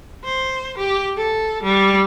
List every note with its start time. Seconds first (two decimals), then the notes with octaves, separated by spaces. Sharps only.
0.24 C5
0.78 G4
1.17 A4
1.63 G3